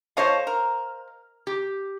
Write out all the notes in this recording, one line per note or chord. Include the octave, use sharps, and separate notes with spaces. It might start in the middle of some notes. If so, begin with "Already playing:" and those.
F4 A4 C5 C#5 D#5 F5
A#4
G4